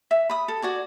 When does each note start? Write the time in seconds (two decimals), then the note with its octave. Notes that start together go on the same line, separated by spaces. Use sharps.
0.11 E5
0.30 B5 D#6
0.48 A4
0.62 F#4 D5 G#5